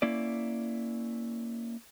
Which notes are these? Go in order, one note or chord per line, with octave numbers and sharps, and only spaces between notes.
A#3 C#4 E4 D5